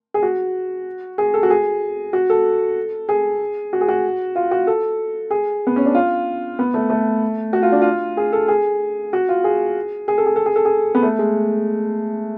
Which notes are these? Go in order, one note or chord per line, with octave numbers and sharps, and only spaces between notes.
G#4
F#4
G#4
A4
F#4
G#4
F#4
A4
G#4
F#4
G#4
F#4
F4
F#4
A4
G#4
B3
C#4
D4
F4
B3
A3
A3
F#4
F4
D4
F4
G#4
A4
G#4
F#4
F4
G#4
G#4
A4
G#4
A4
G#4
A4
G#4
B3
A3
G#3